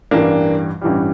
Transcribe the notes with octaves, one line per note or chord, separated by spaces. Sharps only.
A1 G2 E3 G3 A#3 D4
A1 G2 E3 G3